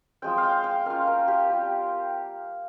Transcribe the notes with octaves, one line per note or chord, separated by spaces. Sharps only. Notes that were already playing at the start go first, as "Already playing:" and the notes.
F3 G#3 C4 G5
F5
G5
G5
A#3 C#4 F4 F5
A#4
G4
G3 C4 F4 G4